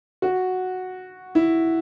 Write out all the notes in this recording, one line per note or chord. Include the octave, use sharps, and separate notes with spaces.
F#4
E4